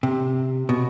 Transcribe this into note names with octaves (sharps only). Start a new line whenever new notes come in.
C3
B2